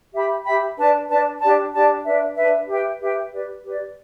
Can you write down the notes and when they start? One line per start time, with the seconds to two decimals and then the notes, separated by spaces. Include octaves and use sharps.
0.13 G4 E5 G5 B5
0.45 G4 E5 G5 B5
0.77 D4 B4 D5 A5
1.08 D4 B4 D5 A5
1.40 D4 G4 D5 A5
1.73 D4 G4 D5 A5
2.05 D4 B4 E5
2.36 D4 B4 E5
2.68 G4 B4 E5 G5
3.00 G4 B4 E5 G5
3.32 G4 B4 D5
3.64 G4 B4 D5